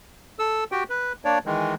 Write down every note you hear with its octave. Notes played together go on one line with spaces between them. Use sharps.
A4 E6
F#4 G4 G5
B4
A#3 D4 C#5 D5
D#3 E3 G#3